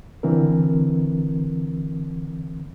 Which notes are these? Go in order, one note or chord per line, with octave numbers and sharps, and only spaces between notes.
D3 E3 C4 A#4